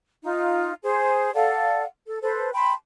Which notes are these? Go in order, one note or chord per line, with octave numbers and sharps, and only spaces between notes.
D#4 F4
G#4 C5
A4 D5 F5 F#5
A4
A4 B4 C5
G5 A5 B5 C6